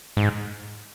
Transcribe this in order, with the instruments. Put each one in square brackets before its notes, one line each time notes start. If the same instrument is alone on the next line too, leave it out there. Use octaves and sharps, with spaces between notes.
[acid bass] G#2